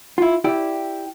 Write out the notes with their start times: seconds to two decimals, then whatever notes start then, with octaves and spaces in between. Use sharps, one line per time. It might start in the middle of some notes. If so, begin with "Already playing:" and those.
0.18 E4 F4
0.44 E4 G4 D5